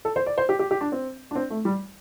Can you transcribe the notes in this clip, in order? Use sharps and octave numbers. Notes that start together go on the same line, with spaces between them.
A4
C5
D5
C5
G4
G4
G4
D4
C4
D4
C4
A3
G3